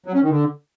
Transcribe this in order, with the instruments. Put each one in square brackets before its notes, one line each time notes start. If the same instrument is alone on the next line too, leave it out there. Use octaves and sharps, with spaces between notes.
[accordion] F#3
C#4
D#3
D3